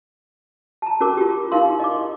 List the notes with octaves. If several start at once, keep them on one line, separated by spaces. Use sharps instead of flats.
A5 A#5
C#4 F#4 A#4 D6
F4 G4
D#4 E4 A#4 F5 C6
D#5 D6